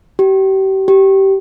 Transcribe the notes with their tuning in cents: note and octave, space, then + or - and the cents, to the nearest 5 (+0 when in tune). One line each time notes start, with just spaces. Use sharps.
G4 -35
G4 -20